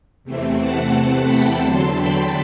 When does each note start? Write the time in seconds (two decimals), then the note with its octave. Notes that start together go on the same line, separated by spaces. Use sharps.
0.24 E2 C3 E3 A3 C4
0.58 F#5 A5
1.24 G5 B5
1.58 E2 D3 F#3 A5 C6
1.92 G5 B5